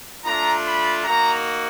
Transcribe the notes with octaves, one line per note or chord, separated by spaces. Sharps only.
A3 D4 F4 A#5
B5
A#3 D#4 F#4 A#5